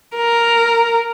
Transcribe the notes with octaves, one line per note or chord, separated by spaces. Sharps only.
A#4